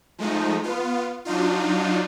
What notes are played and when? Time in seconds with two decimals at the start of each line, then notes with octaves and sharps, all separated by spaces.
0.18 F3 G#3 A3 D#4
0.64 B3 F4
1.25 F#3 D4 D#4 F4